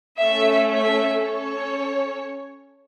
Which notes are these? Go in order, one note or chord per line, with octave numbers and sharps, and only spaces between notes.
A3 C#4 A4 E5
E5
C#4 A4 C#5